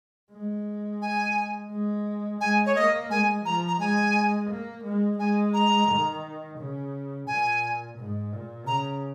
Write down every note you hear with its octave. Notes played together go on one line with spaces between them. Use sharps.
G#3
G#5
G#3
G#3 G#5
C#5
A#3 D#5
G#3 G#5
F3 A#5
A#5
G#3 G#5
A#3
G#3
G#3 G#5
A#5
D#3
C#3
A#2 G#5
G#2
A#2
C#3 A#5